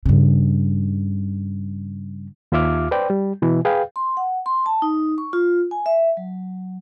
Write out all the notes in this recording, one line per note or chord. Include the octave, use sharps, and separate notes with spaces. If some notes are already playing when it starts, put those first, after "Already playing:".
G2 C#3
D#2 F4 E5 D6 F6
B4 C5 D5 G5
G3
B2 E3
G#4 B4 F5 G5
C6
F#5
C6
A5
D#4
C#6
F4
G#5
E5
F#3